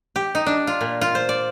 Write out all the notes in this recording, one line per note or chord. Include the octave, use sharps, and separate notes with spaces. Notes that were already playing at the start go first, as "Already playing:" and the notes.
G4
D#4
D4
F4
A#2
F4
C5
D5